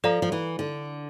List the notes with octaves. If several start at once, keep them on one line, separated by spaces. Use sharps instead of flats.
F3 A4 D5 F5 A#5
F3
E3
D3